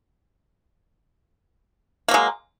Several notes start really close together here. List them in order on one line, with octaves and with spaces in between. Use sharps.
A#3 F#3 G#3